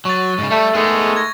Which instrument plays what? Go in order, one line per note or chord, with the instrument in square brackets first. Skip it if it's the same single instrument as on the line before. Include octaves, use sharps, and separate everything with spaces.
[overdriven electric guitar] F#3 [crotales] C#6 A6
[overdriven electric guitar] G#2 C#3
[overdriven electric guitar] G3 [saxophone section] A3
[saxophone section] D#3 G#3 A3 [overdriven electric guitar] B3 G#4
[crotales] G#6 A#6